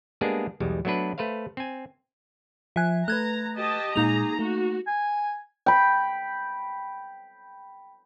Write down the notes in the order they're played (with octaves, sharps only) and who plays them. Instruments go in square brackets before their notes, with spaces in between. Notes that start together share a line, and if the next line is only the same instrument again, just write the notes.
[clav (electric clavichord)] G3 G#3 A#3 B3 D4 G#4
B1 E2 B2 G3 G#3
F#3 A3 B3 D4 B4
A3 B4 C5 F5
C4 G#5
[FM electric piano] F3 G#5 [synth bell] E5 F#6
[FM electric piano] A3 B4 [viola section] A#5 [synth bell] F#6 G#6
[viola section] G4 D#5 A5
[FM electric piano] A#2 G#3 [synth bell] A#3 D#4 F7 [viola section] G#4 A#5
[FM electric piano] A3 [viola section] F#4
[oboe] G#5
[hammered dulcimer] G5 B5